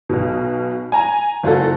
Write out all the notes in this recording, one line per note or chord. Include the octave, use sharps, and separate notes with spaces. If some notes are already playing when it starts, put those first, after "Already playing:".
B1 B2
G#5 A#5
F#1 F4 F#4 A4